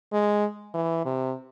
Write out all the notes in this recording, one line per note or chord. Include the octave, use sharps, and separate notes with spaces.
G#3
E3
C3